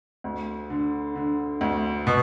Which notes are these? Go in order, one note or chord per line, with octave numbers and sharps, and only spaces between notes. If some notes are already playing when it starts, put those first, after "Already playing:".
D2
D3
D3
D2
B2